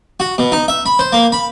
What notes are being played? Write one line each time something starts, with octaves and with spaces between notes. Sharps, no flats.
F#4
B2
D#4
E5
B5
C5
A#3
B5